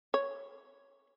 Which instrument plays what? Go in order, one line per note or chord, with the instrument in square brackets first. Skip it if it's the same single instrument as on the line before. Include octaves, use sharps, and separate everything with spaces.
[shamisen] C#5